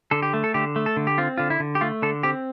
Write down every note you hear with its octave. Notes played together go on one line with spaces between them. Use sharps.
D3 A4
G4
A3
A4
D3 G4
A3
A4
D3
G4
C4 F4
D3 F4
E4
D3
G4
A3 F4
D3 A4
C4 G4